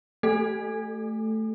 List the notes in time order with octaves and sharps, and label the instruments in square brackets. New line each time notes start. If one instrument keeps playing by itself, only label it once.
[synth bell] A3 A4